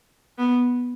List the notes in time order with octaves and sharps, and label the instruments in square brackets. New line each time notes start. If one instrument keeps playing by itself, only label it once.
[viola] B3